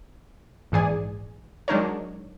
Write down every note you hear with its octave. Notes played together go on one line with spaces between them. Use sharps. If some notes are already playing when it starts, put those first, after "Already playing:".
A#1 G#2 E3 G#4 D5 G#5
F#3 G#3 D4 D#4 A#4 C#5